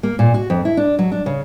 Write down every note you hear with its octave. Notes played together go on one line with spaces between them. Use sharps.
A#3
A#2
F#4
F2
E4
D4
F#3
D4
C#3